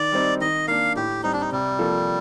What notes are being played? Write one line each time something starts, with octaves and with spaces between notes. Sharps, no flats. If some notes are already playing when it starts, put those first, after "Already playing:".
Already playing: D#3 D5
G3 C4 D#4
D#3 D#5
A#3 D4 F5
A2 G4
G3 C4 D#4
D4
D#4
C3 G3
F3 A#3 F4 A4